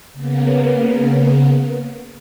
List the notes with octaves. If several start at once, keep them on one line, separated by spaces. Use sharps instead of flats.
C#3 A#3 B3